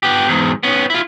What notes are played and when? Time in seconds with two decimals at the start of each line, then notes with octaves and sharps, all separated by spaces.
0.03 B3 G4
0.28 E2 G#2
0.63 B3 C#4
0.90 E4 F4